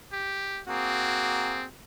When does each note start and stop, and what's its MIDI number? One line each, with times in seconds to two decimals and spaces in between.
0.12 0.61 67
0.68 1.69 58
0.68 1.65 60
0.68 1.69 66
0.68 1.69 68